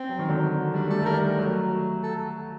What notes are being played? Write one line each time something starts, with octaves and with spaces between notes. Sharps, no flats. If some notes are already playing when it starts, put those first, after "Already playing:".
Already playing: C4
F#3
D#3
D3 F#3
G3 D4
A3 A4
D#3 G3 A#4
F#3 A3
A4